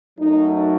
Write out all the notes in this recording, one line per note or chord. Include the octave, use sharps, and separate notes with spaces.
F#2 F#3 A3 D#4